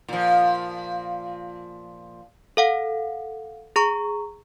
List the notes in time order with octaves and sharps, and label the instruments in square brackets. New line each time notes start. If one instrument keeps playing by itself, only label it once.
[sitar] A#2 F3
[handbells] A4 F5 F#5
G#4 A#5 C#6